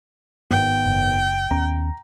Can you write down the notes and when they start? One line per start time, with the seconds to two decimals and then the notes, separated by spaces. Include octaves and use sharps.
0.51 G#1 B3 G5
0.86 F#1
1.51 D#2 B3 C#4 A#5